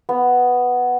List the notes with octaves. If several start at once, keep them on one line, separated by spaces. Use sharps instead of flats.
B3